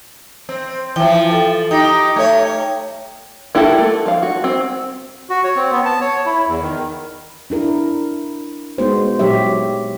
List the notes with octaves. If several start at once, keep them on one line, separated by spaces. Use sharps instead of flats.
C4
E3 F3 G5
A4
D#4 G4 G5
A3 C#5
A#3 E4 F#4 G4 A4
A3
F3 F5
F#4
C4
F#4
C#5
C4
B3
A5
C#5
E4
E2
D#3
D4 E4 A#4
G#3 A#3 B3 D#4 F#4 C5
A#2 F#3 G4 C#5 E5